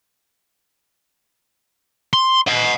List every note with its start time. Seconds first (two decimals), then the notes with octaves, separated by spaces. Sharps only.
2.13 C6
2.47 D#5 F#5